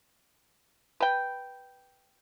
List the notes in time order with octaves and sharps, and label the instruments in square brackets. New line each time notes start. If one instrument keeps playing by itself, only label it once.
[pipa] B4 G5